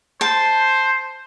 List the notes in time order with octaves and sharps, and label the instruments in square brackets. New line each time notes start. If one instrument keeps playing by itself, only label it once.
[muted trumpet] C5 [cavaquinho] A5